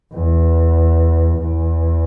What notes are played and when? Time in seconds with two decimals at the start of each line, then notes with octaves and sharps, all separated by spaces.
0.13 E2
1.38 E2